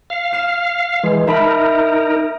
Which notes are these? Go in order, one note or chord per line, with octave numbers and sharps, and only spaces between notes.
F5
F6 C7 E7
E3 G#3
D#4 A#4 E5 A5 B5